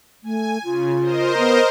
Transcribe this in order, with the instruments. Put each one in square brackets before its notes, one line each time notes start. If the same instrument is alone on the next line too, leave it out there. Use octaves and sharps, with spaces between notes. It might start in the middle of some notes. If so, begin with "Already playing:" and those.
[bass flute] A3 [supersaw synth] G#5
[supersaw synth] C#3 [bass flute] F4
[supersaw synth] A#4 C5 D#5
[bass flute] B3